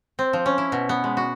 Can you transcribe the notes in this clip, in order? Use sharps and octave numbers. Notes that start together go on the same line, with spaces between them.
C4
F3
C#4
E4
B2
B3
G#3
F#4